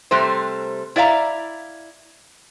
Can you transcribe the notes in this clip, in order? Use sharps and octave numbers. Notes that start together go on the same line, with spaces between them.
C3 G3 A3 C5
E4 D5 E5 F5 A#5